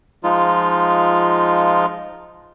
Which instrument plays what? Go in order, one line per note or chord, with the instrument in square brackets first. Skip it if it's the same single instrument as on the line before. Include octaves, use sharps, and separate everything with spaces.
[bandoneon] F3 G#3 D#4 F4